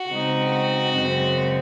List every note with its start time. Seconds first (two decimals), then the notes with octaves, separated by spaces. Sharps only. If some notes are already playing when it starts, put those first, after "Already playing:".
Already playing: F#4
0.09 C#3 G#3 C4 D#4
0.52 F#4
0.96 F#2 C#3 G#3 C4